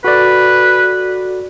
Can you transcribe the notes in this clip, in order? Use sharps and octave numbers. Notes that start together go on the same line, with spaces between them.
F#4 A4 B4 D5